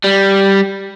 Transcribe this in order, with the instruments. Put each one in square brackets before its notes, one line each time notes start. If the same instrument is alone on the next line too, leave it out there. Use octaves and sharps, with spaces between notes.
[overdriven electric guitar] G3